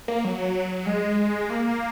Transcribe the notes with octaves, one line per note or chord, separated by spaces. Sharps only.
A#3
F#3
G#3
A#3